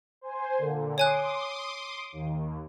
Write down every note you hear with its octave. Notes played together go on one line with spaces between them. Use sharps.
C5 G#5
A#2 D3
C#5 G#5 C6 D6 D#6 F#6
D#2